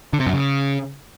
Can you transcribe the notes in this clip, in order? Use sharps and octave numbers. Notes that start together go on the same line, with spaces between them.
D3
C3
F#2
C#3